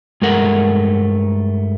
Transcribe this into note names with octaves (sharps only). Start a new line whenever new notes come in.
G2 G#3 A3 A#4 F#5